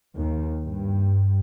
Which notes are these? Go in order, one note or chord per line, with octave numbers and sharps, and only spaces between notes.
D#2
G2